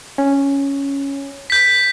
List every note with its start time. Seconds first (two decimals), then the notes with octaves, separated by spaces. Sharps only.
0.18 C#4
1.50 G6 B6